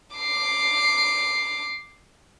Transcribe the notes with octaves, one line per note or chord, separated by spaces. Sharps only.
D6 C7